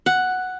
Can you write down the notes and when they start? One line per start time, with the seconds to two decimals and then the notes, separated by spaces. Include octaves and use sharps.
0.06 F#5